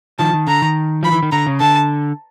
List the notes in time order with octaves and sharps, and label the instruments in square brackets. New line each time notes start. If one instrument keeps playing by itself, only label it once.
[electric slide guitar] D#3 F3 [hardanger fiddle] A5
[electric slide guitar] D#3
[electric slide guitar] D3 [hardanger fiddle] A#5
[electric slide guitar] D#3
[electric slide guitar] F3 [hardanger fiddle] B5
[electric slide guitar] E3
D#3
[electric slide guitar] D3 [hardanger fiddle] A#5
[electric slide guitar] C#3
[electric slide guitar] D3 [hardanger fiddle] A5